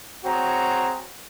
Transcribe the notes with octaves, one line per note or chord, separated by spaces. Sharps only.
C4 F#4 G#4 C#5 A#5